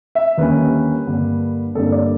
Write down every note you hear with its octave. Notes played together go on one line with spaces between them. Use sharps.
E5
D#2 D3 G3 A#3 C#4 B4
G2 D3 G3 A#3 D4
G2 D3 G3 A#3 D4 A4
D5